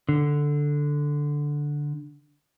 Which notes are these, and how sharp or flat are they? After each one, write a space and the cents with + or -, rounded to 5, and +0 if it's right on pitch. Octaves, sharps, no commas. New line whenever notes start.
D3 +0